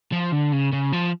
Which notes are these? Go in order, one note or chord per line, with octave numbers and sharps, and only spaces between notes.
F3
D3
C#3
C#3
F3